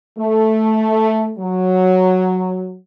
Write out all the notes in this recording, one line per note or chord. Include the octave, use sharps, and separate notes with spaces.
A3
F#3